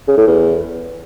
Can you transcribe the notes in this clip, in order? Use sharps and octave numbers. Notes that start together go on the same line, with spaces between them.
C#3
A2
E2